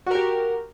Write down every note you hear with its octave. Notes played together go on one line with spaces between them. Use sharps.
F#4 G4 A#4